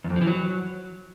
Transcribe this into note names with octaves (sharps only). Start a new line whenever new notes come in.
E2
F2
F3
E3
F#3